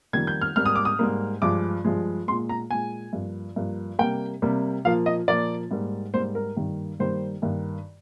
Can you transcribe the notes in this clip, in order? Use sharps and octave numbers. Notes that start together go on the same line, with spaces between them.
F2 D#3 G3 A#3 G#6
G6
F6
G#2 G3 A#3 F6
D#6
D6
D#6
G#2 G3 A#3
G2 F3 G#3 D6
G2 F3 G#3
A#2 G#3 C6
A#5
A#2 G#3 G#5
G2 F3 A#3
G2 F3 A#3
C3 G3 A#3 G5
C3 G3 A#3
A#2 F3 A#3 F5
D#5
A#2 F3 A#3 D5
G#2 G3 A#3
G#2 G3 A#3 C5
A#4
G2 D#3 G3 A#3
G2 D#3 G3 A#3 C5
G2 D#3 A#3